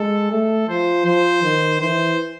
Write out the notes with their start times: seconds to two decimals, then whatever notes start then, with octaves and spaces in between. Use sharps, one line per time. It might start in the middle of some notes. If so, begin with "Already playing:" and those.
Already playing: G#3 A4
0.31 A3 A4
0.69 F3 C5
1.05 F3 C5
1.43 D#3
1.80 E3 C5